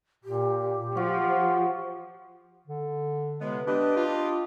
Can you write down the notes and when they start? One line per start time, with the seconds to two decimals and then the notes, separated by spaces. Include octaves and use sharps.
0.24 A#2 G4
0.95 F3 F4 F#4 C#5
2.67 D3
3.41 A2 C3 G#3 B3
3.67 D4 G4 B4 D#5
3.97 D4 F4